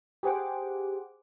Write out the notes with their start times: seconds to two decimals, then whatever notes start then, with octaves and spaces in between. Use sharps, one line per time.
0.23 G4 G#4 C5 F#5 D6